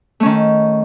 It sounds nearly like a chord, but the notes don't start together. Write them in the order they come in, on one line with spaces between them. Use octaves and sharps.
A3 C#4 D#3